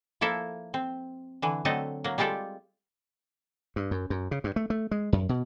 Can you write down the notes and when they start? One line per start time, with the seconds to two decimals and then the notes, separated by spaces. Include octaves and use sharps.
0.21 F3 A#3 E4 A4 E5
0.74 C4
1.42 D3 E3
1.65 D3 F#3 A3 C4 A4 D#5
2.04 F#3 A#3
2.18 G3 G#3 F4 G4 A4 D5
3.76 G2
3.91 F#2
4.10 F#2
4.31 C#3
4.44 G2
4.56 A3
4.70 A3
4.91 G#3
5.13 F#2
5.29 B2